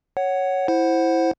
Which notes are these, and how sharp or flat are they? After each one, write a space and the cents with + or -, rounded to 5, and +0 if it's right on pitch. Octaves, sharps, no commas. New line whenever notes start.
C#5 +0 F#5 +10
E4 +0 C5 +10 F#5 +0